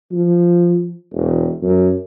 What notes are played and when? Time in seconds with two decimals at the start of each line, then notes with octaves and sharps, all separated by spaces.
0.12 F3
1.13 E1
1.62 F#2